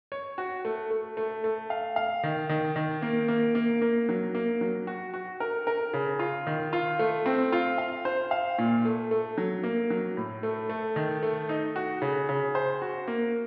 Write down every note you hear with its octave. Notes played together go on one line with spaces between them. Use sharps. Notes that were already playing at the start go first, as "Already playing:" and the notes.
C#5
F#4
A3
A3
A3
A3
F5
F5
D#3
D#3
D#3
A#3
A#3
A#3
A#3
F#3
A#3
F#3
F#4
F#4
A#4
A#4
C#3
F4
D#3
F4
A3
C4
F4
F5
C5
F5
A#2
A3
A3
F#3
A#3
F#3
A2
A3
A3
D#3
A3
D#4
F#4
C#3
C#3
C5
F#4
A#3